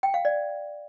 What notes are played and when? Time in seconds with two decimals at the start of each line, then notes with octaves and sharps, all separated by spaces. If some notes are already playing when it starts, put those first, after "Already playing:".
0.03 G5
0.14 F5
0.25 D5